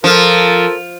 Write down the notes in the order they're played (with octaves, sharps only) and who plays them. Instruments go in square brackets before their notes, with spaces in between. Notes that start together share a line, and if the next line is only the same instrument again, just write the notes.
[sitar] F3 [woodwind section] F4 A4 A#4